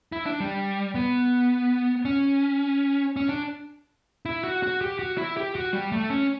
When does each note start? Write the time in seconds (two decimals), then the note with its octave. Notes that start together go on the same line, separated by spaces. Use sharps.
0.12 E4
0.26 D4
0.40 G3
0.95 B3
2.05 C#4
3.16 C#4
3.29 D4
4.25 E4
4.44 F#4
4.63 F#4
4.81 G4
4.99 F#4
5.17 E4
5.37 G4
5.55 F#4
5.73 G3
5.92 A3
6.10 C#4